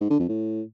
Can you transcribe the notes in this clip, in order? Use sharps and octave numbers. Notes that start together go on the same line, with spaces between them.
G#2
D3
F2
A2